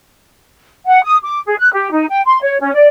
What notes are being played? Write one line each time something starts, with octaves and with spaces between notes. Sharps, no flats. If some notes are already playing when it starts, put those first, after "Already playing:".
F#5
D#6
D6
G#4
F#6
G4
D#4
G5
C6
C#5
C#4
D5